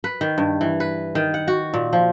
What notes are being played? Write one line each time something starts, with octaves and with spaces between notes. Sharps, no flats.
B4
D#3
G2
E3
B4
D#3
F#5
F#4
A#2
F3